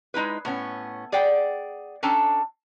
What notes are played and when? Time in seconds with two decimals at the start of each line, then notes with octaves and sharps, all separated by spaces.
0.14 G#3 D#4 E4 B4
0.45 A2 B3 C#4
1.12 G#4 D5 F#5 G5
2.03 C#4 D4 A4 G5 A5 A#5